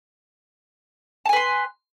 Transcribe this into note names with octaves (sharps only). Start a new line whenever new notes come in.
B4 G#5 A5 C6